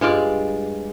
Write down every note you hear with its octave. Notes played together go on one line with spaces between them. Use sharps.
G2 G#3 F4 D5